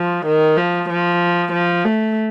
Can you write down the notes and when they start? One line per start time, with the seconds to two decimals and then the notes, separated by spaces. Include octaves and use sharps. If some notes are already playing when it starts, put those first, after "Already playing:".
Already playing: F3
0.26 D#3
0.57 F3
0.89 F3
1.52 F3
1.84 A3